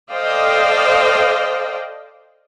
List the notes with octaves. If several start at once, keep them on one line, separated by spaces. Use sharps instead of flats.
A4 C5 D5 D#5 F5 G5